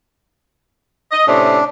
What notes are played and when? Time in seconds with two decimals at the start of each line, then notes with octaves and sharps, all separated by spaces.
1.12 D#5
1.27 A2 C3 C#4 D4